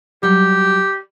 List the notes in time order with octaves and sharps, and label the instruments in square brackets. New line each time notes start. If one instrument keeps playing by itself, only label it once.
[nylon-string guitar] F#3 G3 [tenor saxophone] G4